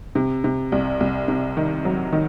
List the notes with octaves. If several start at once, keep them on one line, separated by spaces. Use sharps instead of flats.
C3
C3
C2
C2
C3
D#3
F#3
D#3